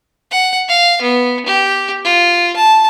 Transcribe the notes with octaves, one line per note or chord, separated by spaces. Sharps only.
F#5
F5
B3
G4
F4
A5